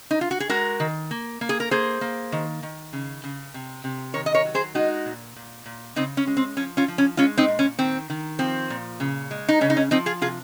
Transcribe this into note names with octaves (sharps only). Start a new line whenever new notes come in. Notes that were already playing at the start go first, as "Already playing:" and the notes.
D#4
F4
F#4
G#4
G#3 F#4 A#4
D#3
A#3
A#3
G#4
A#4
A#3 G#4 C5
A#3
D#3
D#3
C#3
C#3
C3
C3
D#3 A#4 C#5
D#5
A#4 C#5
F#3
G#4 C5
G#3 D#4 F#4
A#2
A#2
A#2
C#3 C4 D#4
C#4
G#3
C4
F3 C#4
C#4 F4
F3
C#4
G#3 C#4 F4
C4 D#4
A#2
C#4
D#3 C4
D#3
F3 C4
A#2
C#3
G#3
D#4
C#3 C#4
D#4
C#4
F3 C4 D#4
F4 G#4
C3 F4 G#4